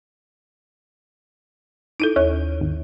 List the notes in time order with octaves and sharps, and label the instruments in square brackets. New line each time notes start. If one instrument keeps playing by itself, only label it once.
[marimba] D#4 E4 A4
[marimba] D#2 [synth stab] C#4
[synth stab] G#1